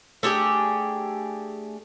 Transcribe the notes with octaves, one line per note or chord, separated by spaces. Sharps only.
A3 D4 G4 G#4